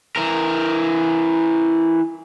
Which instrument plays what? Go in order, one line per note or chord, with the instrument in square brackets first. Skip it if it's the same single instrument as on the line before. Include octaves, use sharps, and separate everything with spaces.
[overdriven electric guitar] E3 A#4